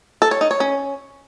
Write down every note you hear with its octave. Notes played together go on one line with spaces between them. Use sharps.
A4
C#5
D#4
C#5
C#4